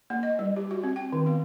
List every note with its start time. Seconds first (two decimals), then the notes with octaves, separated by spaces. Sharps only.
0.10 A#3
0.23 D#5
0.39 G3
0.56 G4
0.71 F#4
0.84 C4
0.96 G5
1.12 D#3
1.26 B3